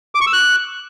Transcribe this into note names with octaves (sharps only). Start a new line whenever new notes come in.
D6
C#6
E6
F#6